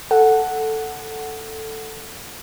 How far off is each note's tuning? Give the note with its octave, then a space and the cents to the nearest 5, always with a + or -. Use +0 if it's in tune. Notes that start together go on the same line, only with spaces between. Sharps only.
A4 +5 F#5 +0